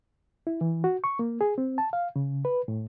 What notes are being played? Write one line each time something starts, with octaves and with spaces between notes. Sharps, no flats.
E4
E3
F#4
C#6
A#3
G#4
C4
A5
F5
C#3
B4
A2